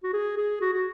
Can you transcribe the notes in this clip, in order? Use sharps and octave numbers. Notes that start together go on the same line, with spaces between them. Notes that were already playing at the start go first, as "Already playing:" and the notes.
F#4
G#4
G#4
F#4
F#4